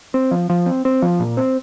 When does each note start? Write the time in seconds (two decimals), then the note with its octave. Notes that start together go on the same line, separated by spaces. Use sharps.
0.14 C4
0.31 F3
0.50 F3
0.66 C4
0.85 C4
1.02 F3
1.19 A#2
1.37 C4